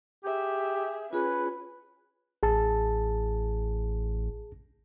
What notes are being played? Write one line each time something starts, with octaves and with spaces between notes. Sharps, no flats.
G4 G#4 E5
C#4 F4 G#4 B4
A1 G#4 A5